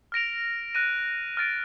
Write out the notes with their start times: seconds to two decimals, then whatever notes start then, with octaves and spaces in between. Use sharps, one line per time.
0.12 F6 A#6 D7 F7
0.75 F#6 A#6 D#7
1.37 F6 A6 D7